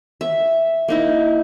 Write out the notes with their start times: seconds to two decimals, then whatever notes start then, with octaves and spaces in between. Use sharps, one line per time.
0.21 E5
0.88 A#3 D#4 E4